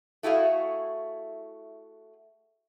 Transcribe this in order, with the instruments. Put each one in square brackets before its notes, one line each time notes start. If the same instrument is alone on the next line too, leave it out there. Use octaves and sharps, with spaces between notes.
[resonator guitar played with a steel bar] A3 E4 F#4 G#4 F5